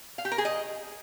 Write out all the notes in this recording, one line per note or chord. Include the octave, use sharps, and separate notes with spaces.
F5
G4
A#4
G#4
D#5